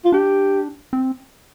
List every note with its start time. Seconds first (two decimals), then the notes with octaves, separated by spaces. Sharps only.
0.04 F4
0.12 D4 G4
0.93 C4